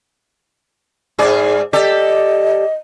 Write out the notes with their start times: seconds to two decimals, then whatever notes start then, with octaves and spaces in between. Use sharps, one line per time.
1.19 G#2 G#4 D5
1.73 G4 A4 D5 D#5